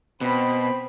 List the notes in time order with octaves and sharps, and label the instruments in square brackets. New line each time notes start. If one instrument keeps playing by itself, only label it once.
[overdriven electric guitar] B2 [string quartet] C4 B5